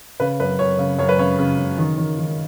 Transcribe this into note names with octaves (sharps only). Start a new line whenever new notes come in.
C#3 B4
F#2 B4
F#2 C#5
C#3
F#2 C#5
B4
C#3 C#5
C#3
C#3
D#3
D#3
D#3